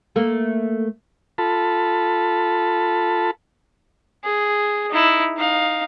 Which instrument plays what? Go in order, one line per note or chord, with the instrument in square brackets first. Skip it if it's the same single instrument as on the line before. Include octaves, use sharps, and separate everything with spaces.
[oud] A3 A#3
[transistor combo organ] F4 A4 A5 B5
[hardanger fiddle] G#4
D#4 E4
D#4 F5